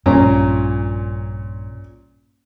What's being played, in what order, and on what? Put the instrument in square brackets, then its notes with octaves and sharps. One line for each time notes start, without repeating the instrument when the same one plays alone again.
[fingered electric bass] A#1 G2 [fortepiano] A#2 C#4 A#5